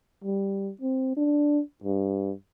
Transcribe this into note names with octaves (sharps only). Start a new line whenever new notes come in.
G3
C4
D4
G2